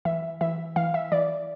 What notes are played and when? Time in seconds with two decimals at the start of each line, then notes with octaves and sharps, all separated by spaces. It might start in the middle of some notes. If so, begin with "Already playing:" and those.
0.05 E3 E5
0.41 E3 E5
0.76 E3 F5
0.94 E5
1.12 E3 D5